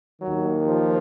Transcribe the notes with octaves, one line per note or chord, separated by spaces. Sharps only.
D#2 D#3 F#3
F3